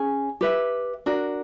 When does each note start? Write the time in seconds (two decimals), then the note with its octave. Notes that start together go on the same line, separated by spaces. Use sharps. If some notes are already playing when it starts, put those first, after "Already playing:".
Already playing: C#4 G#4
0.41 G4 B4 E5
1.06 D4 F#4 A#4